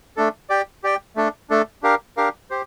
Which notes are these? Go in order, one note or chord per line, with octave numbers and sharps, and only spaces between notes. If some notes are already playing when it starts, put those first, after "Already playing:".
A3 D4 A4
G4 D5 G5
G4 D5 G5
A3 D4 A4
A3 D4 A4
D4 G4 A#4 F5
D4 G4 A#4 F5
G4 C5